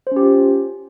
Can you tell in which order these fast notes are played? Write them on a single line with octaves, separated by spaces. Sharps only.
C5 C#4 G4 F4